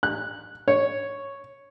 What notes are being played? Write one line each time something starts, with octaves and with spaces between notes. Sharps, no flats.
F#6
C#5